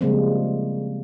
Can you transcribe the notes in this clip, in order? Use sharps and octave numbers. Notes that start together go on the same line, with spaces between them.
C#3 F3 G3 G#3 A#3 C4